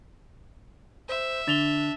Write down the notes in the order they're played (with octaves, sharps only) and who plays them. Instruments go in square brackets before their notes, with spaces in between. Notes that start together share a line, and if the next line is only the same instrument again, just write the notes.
[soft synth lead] C5 [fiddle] E5
[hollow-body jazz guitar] D3 [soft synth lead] D4 [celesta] A6 F7 G7